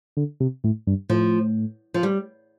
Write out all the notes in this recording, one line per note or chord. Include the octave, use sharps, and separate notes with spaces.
D3
C3
A2
G2
A2 F3
F3
G3